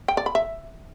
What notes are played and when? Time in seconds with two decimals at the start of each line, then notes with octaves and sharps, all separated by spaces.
0.08 G5
0.17 D5
0.26 B5
0.35 E5